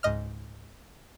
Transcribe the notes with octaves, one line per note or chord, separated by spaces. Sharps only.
C#2 G#2 D#5 F6